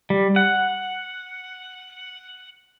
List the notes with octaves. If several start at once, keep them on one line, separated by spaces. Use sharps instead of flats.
G3
F#5